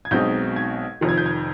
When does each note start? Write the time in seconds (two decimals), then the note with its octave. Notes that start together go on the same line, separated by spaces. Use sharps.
0.05 G#6
0.11 B1 B2 G#3 C4 D#4 G6
0.56 G#6
1.01 F1 F2 D#3
1.09 G#6
1.18 G6
1.26 G#6